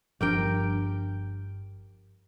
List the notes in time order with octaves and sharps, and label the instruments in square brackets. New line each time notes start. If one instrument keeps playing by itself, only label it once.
[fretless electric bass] G1 F3 D4 [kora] G4 A#4 G5